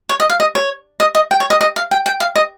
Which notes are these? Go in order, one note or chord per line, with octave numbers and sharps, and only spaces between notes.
C#5
D#5
F5
D#5
C#5
D#5
D#5
G5
C#5
D#5
D#5
F5
G5
G5
F5
D#5